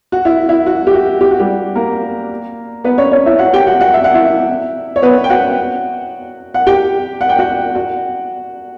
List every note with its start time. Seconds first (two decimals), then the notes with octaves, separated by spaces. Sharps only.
0.12 F#4
0.25 E4
0.49 E4
0.66 F#4
0.87 G4
0.94 F#4
1.21 G4
1.31 F#4
1.40 G3 G4
1.75 A#3 A#4
2.84 B3 B4
2.98 C#4 C#5
3.12 C#4 C#5
3.26 E4 E5
3.39 F#4 F#5
3.54 G4 G5
3.67 F#4 F#5
3.81 F#4 F#5
3.94 E5
4.04 F#5
4.14 E4 E5
4.96 C#5
5.02 B3 B4
5.24 G5
5.30 F#4 F#5
6.54 F#5
6.67 G4 G5
7.21 F#5
7.29 G5
7.39 F#4 F#5
7.75 F#4 F#5